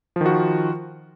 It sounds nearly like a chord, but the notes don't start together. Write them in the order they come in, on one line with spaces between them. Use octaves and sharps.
F3 D#3 F#4 F4